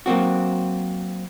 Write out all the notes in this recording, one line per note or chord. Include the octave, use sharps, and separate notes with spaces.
F#3 A#3 C4 F#4